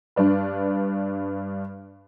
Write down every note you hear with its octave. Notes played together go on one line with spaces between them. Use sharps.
G2 D4 B4